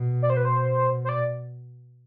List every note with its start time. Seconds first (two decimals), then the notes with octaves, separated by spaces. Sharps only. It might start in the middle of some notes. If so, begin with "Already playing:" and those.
Already playing: B2
0.22 D5
0.30 C5
0.37 B4
0.45 C5
1.05 C5
1.09 D5